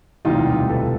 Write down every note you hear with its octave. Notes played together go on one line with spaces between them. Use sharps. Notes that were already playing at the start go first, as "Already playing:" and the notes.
E1 D2 C3 E3 G3 D#4 F4
A4 B4